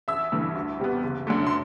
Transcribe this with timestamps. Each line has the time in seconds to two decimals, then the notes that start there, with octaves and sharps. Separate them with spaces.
0.08 A1 E5 E6
0.32 G2 E3 A3
0.55 D2
0.80 C3 G3 B3
1.03 F#1
1.27 F#2 D3 A3
1.47 C6